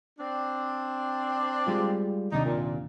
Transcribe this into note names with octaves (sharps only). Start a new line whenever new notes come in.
C4 D4
G3 G#3 F4
D#2 C3 D4 D#4
A#2